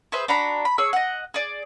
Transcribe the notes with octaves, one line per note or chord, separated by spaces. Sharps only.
G#4 B4 C5 E5
D4 F#4 A#5 B5
B5
G#4 C#5 E6
D#5 F#5
G#4 D5